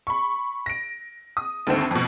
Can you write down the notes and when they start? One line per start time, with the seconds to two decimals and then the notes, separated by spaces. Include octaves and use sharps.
0.07 B5 C#6
0.66 A#6 D7
1.37 D#6
1.67 D2 G2 D3 D#3 A3 C4
1.91 F2 B2